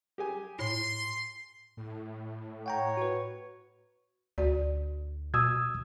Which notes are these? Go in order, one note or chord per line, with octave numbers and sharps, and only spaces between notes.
G4 G#4 G#5
A2 C6
A2
C#5 F#5 G5 A#5
F#4 B4
D2 F#4 D5
B2 D#6 E6 G#6